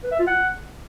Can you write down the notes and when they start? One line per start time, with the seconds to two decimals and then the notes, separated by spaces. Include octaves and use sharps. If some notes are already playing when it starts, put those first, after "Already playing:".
0.03 B4
0.11 E5
0.19 F4
0.27 F#5